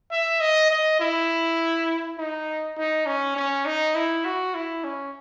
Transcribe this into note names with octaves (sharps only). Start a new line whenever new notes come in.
E5
D#5
D#5
E4
D#4
D#4
C#4
C#4
D#4
E4
F#4
E4
C#4